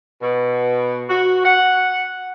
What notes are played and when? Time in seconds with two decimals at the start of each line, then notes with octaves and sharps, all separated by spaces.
0.22 B2
1.10 F#4
1.45 F#5